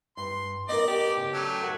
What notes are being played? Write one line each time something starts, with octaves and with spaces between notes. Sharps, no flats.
G2 C6
B3 A#4 D5 D#5
G4
C#3
F#3 A3
F#4 A4 A#4